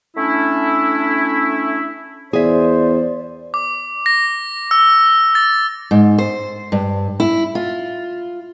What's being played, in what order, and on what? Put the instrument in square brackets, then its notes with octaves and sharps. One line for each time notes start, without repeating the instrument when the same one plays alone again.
[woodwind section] A3 C#4 D4 E4
[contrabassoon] E2 [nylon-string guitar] G#4 E5 [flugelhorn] C5 [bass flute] D5
[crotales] D6
A#6
E6
A6
[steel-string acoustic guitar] G#2
C5
G2
E4
F4